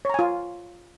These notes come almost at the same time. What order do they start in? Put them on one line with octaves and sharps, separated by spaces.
C#5 A#5 G#5 F4